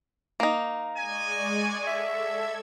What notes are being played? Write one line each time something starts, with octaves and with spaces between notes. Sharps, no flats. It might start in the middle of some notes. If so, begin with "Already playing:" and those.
A#3 D#4
G#3 D5 D#5 G#5 C#6
A4 E5 E6 G#6